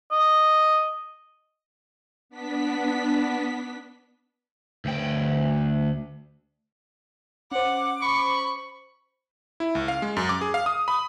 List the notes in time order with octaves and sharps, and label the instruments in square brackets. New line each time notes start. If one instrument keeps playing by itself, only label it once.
[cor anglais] D#5
[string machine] B3 D4 B6
[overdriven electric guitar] D2 G5
[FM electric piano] C#4 C5 [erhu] F#5 [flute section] D6
[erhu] B5 [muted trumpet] C#6
[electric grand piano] E4
C#2
F5
G#3
F#2
D6
G#4
F5
D#6
B5